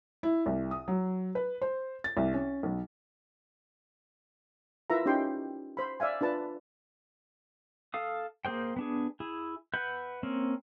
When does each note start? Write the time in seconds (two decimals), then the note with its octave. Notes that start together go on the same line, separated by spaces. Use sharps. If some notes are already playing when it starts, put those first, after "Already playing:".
0.23 E4
0.46 C2
0.71 D#6
0.88 F#3
1.35 B4
1.61 C5
2.04 A6
2.17 C2
2.34 C#4
2.63 B1
4.90 E4 F4 A#4 B4 E5 A#5
5.06 C#4 D#4 G4 G5 C6
5.77 C5 B5
6.00 D5 E5 F5 G#5
6.21 D4 F4 B4 A5
7.94 A4 F5 D#6
8.45 A#3 G#4 C5 G5
8.77 B3 D4 G#4
9.20 E4 G#4
9.74 B4 E5 F#5 B5 G6
10.23 A#3 C4 C#4